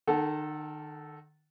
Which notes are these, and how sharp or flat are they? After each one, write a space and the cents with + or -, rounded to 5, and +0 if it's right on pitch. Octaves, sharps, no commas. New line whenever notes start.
D#3 -35 A4 -10 F#5 +0